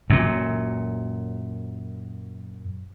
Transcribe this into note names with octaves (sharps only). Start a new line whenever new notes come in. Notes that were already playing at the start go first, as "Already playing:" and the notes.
F#2 A#2